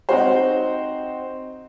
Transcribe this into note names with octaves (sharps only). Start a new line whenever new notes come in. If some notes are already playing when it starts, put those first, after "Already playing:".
C4 D#4 F#4 C5